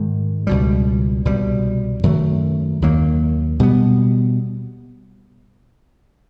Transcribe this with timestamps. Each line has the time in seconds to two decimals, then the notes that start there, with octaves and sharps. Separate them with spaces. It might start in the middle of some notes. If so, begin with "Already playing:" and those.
Already playing: G#2 D#3 G#3
0.47 C#2 B2 G3
1.25 C2 B2 G3
2.03 F#2 D#3 F#3 A3
2.82 D#2 D#3 F#3 A#3
3.60 B2 G3 B3